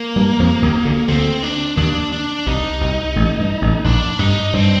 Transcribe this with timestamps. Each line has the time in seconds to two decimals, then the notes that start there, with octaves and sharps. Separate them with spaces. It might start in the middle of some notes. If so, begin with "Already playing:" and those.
Already playing: A#3
0.16 G2 G3
0.39 F2 F3
0.63 D#2 D#3
0.85 D2 D3
1.08 D2 D3 C4
1.43 D4
1.77 D#2 D#3 D4
2.12 D4
2.47 C2 C3 D#4
2.81 C2 C3
3.16 A1 A2
3.39 G2
3.62 A1 A2
3.84 A#1 A#2 D4
4.19 G2 G3 D#4
4.53 G2 G3 C4